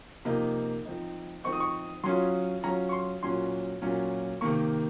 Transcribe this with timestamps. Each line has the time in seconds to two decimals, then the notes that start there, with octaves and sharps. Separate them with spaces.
0.25 C3 F3 A#3 D#4
0.85 F3 C4 D#4
1.44 F3 C4 D#4 C#6
1.53 D#6
1.60 C#6
2.04 F#3 C#4 F4 C6
2.62 F#3 C#4 F4 A#5
2.89 C#6
2.92 C6
3.23 A#2 F#3 C#4 F4 C6
3.82 A#2 F#3 C#4 F4
4.41 C3 D#3 A#3 C#6